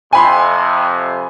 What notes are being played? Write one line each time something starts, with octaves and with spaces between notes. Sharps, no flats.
F2 C3 G#5 B5 C6